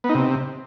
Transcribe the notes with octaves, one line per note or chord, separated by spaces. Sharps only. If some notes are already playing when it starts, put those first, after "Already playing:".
B3
D#4
C3